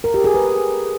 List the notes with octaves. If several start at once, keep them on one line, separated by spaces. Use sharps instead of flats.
A#4
G4
G#4
B4